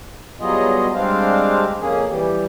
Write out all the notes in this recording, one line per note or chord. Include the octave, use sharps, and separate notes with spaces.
F#3 G3 B3 F4 G#4 D#5
G3 G#3 C4 D4 C5 F5
F2 A#3 C#4 G#4
E3 G3 G4